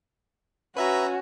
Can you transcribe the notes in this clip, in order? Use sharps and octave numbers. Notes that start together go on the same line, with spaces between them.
C#4 F#4 B4 E5 A#5